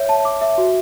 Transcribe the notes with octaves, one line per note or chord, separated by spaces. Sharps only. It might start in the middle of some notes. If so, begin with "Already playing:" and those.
Already playing: C#5 E5
A5
D6
E5
F#4